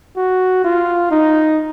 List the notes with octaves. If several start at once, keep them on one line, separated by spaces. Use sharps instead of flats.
F#4
F4
D#4